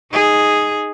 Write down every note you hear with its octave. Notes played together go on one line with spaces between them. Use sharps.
D#4 G#4